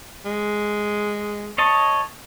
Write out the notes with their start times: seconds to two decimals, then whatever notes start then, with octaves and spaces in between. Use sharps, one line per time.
0.25 G#3
1.58 C#5 D#5 A5 C#6